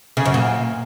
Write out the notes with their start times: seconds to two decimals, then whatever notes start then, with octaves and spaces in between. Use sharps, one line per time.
0.17 C#3
0.25 F#2
0.34 A#2